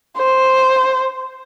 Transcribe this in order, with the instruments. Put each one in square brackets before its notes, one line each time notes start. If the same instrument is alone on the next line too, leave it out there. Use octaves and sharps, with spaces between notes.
[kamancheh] C5